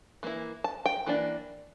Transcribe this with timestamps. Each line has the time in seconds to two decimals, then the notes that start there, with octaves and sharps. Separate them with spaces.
0.23 E3 A#3 E4
0.64 A5
0.86 G5
1.06 E3 A#3 D4